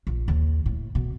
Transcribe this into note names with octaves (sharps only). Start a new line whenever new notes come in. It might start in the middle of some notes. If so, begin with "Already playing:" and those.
A#1
D#2
A2
B2